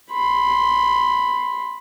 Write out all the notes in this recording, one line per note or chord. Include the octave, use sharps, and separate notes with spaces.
B5 C6